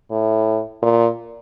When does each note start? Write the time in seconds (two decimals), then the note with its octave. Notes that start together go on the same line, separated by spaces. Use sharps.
0.11 A2
0.82 A#2